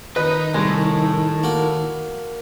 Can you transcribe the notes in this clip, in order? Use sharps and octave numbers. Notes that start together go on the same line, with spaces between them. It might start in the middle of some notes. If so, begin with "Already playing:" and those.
D#3 D#4 B4 D#5
C2 A2 G#3
A#3 F#4